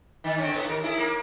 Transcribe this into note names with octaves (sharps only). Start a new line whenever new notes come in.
D#3
D3 C4 C#4
A2 B3
D#2 A#4
E4 G#4
A#3